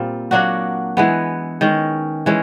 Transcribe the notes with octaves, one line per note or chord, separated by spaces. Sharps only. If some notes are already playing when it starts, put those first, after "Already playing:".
Already playing: A#2 G3 C4 F4
F#3 A#3 D4 F#4
E3 G#3 B3
D#3 G#3 C#4
E3 G#3 C#4